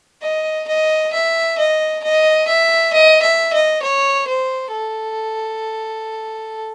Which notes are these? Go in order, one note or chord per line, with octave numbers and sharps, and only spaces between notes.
D#5
D#5
E5
D#5
D#5
E5
D#5
E5
D#5
C#5
C5
A4